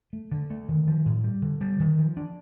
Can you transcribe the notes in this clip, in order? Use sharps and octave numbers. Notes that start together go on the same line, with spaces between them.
A3
D3
A3
D#3
F3
A2
G3
D3
G3
D#3
F3
D4